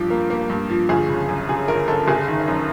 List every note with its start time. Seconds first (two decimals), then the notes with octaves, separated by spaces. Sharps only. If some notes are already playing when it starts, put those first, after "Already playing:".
Already playing: G2 F3 G4
0.10 A#3
0.30 A#3
0.50 G2
0.70 F3
0.89 G1 G#4
1.09 C#3
1.29 F#2
1.49 C#3 G#4
1.68 G1 A#4
1.88 G1 A4
2.08 F#1 G#4
2.28 D#3
2.48 F#2